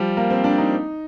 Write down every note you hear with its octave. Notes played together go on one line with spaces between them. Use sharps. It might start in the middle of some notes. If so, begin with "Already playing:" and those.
Already playing: F3 G3
A#3
C4
D4
D#4